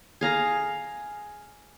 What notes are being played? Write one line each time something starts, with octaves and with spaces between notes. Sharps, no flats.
G#4 F5 A#5